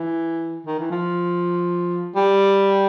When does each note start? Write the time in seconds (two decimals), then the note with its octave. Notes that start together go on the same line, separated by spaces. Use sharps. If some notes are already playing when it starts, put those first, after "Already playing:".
Already playing: E3
0.66 D#3
0.79 E3
0.91 F3
2.16 G3